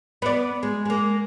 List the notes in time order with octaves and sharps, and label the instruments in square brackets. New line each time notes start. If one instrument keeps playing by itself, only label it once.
[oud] B3 D5
G#3
G#3 A#3